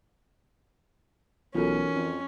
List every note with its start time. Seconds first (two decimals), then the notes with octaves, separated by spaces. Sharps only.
1.55 B1 E3 C#4 D#4 F4 F#4 A4 A#4
1.95 F2